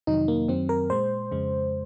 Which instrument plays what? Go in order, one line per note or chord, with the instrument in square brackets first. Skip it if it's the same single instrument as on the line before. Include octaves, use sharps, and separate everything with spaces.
[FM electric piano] F2 C3 D#3 F#3 D#4
A#3
F#2 D#3 F#3 C4
A#4
A#2 G#3 C5
F2 C#3 G#3